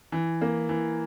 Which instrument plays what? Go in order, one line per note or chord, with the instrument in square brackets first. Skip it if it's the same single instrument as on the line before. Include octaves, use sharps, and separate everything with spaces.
[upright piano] E3
A#3
E3